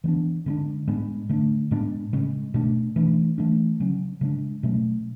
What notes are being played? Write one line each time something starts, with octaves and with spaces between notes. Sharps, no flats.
E3 G#3 B3 D4
D3 G#3 B3 D4
A2 G#3 B3 D4
D3 A3 D4
A2 G#3 B3 D4
C#3 G#3 C#4
B2 A3 D4
E3 A3 D4
E3 A3 D4
C#3 F#3 C#4
C#3 G#3 D4
B2 F#3 A3 C#4